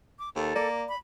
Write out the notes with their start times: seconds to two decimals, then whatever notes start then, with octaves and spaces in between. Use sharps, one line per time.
0.19 D6
0.36 D#2 A4
0.55 A#3 D5
0.89 B5